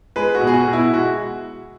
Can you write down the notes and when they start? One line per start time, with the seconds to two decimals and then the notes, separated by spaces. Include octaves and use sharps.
0.16 G#3 B4
0.35 F#4
0.41 B2
0.47 G#4
0.54 F#4
0.67 B2
0.73 E4
0.93 G#3 F#4